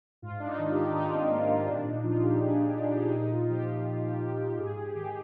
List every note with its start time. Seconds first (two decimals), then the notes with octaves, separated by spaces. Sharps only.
0.22 G#2 F4
0.39 D4
0.46 D#4
0.59 D#3
0.71 G4
0.95 G#2 D#4
1.06 D4
1.13 C4
1.31 D#3 A#3
1.50 C4
1.68 A#2 D4
1.86 D#4
2.04 F3 F4
2.23 G4
2.41 A#2 G#4
2.77 F3
2.89 F4
3.04 D4
3.14 A#2 D#4
3.31 F4
3.49 F3 G4
3.86 A#2 F4
4.04 G4
4.22 F3 G4
4.40 G4
4.58 G#2 G#4
4.77 G4
4.95 D#3 G4